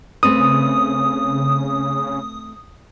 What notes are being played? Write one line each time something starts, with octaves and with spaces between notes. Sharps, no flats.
C#3 A3 C4 B4 D#6